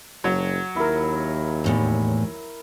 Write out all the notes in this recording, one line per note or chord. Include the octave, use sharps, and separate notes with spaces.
F#1 F#3
D#2 E4 A#4
E2 A2 C3